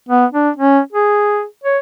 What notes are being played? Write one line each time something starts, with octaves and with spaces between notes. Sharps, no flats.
B3
D4
C#4
G#4
C#5